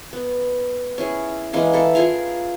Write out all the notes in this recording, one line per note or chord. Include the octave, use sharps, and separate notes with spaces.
B3
C#4 E4 G#4
E3 G#3 A#3 C#4
E4 A4
F4 G#4 A#4 F5